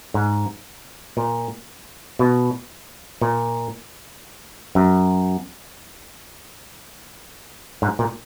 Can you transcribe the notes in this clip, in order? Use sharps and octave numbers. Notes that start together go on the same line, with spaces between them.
G#2
A#2
B2
A#2
F#2
G#2
A#2